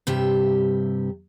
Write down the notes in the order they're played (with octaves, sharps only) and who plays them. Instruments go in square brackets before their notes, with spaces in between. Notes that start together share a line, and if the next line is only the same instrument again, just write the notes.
[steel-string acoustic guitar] G2 C3 G4 E5